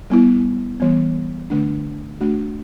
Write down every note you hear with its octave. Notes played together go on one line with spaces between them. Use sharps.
G3 B3 E4
E3 G3 B3
D3 A3 D4
A3 D4 F#4